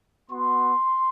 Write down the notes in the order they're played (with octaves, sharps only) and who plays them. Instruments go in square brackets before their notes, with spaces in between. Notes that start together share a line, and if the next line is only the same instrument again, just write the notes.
[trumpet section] B3 F#4 C6